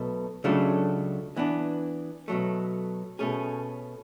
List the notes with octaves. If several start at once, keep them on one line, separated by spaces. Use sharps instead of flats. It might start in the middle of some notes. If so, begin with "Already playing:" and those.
Already playing: B1 B2 A3
C#2 C#3 F#3 A3 D4
E3 B3 D4
B2 F#3 A3
B2 A3 C#4 G#4